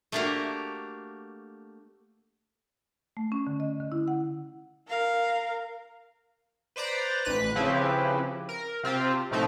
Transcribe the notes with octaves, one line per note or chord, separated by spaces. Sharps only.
A3 A#3 D4 F#4 G4 A#4
A3
C#4
D3
D#5
D3
E4
F#5
A#4 F5
B4 C5 D5 A#5
A1 B4 F#6
C#3 F3 C4 E4 G4 B4
A#4
C3 C4 F4 G4
A2 C3 F3 A3 C4 D#4